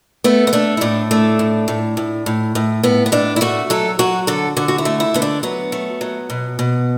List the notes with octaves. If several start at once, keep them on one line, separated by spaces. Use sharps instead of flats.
A3 B3
B3
A3 D4
E4
A2 D4
A3 D4
A2
A2
A2
A2
A2
A2 B3
B3
A2 D4
E4
A3 F#4
F#3 A4
F#3 F#4
D3 A4
D3 F#4
F#4
E4
A3
E4
D3 B3
D4
F#3 B3
A3
F#3
B2
B2